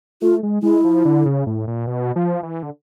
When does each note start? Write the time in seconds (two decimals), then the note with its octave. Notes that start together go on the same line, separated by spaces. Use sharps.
0.22 A3 F4
0.43 G#3
0.63 G#3 E4
0.84 F3
1.05 D3
1.26 C#3
1.47 A2
1.67 A#2
1.87 B2
2.16 F3
2.43 E3
2.63 D3